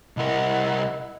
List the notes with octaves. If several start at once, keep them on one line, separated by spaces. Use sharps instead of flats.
C2 E4 A#4 D#5 F#5